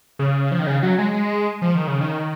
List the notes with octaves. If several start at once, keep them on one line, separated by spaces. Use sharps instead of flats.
C#3
F3
D#3
C#3
F#3
G#3
G#3
F3
D#3
C#3
D#3